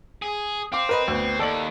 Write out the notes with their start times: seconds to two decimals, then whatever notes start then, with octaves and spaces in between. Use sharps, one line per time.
0.22 G#4
0.72 C4 F5 D6
0.89 A#4 B4 D#5
1.08 D2 B3
1.39 D#2 A4 D5 F#7